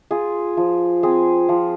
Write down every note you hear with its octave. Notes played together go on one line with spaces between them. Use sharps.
F4 G#4
F3
C4 G#4
F3